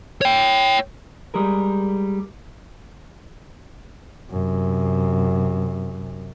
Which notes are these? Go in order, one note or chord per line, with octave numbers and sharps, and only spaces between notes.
C#5 G5
G3 G#3 G#4 A#4
F#2 C3